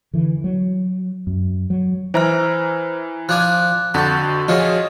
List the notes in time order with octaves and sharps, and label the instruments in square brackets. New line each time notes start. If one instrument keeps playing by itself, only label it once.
[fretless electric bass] D3 E3
F#3
F#2
F#3
[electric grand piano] E3 A#5 [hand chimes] C5 E5 F6
[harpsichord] F3 D4 G#5 [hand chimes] F#6
[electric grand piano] F2 D3 [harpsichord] F#4 [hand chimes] C#6 G6 A6
[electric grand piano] F3 F#4 G#4 [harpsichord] C#4 F4 [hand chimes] D#5